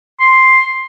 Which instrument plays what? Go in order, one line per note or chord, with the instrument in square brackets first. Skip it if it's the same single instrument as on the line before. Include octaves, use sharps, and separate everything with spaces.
[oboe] C6